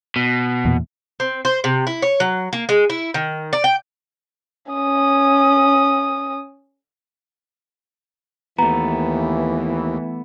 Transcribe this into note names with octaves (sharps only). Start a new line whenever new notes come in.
B2
E2 A#2
C4
C5
C3
E4
C#5
F#3
A#3
G#3
E4
D#3
D5
G5
C#4 D#6
D#2 E3 A3 B3 A#5